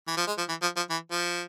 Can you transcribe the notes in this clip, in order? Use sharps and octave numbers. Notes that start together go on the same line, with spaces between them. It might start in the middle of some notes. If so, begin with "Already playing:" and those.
E3
F3
G#3
F3
E3
F3
F3
E3
F3